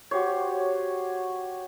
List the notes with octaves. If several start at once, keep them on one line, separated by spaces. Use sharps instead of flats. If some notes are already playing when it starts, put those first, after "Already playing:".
F#4 G4 C5 C#5